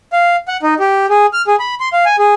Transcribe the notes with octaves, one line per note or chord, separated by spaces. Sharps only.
F5
F#5
D#4
G4
G#4
F6
G#4
B5
C6
F5
G#5
G#4